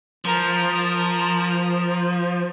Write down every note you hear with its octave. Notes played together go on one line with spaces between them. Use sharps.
F3 A#4 A#5